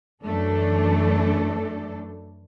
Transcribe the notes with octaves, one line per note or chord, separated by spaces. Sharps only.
F#2 E3 A3 D4 A4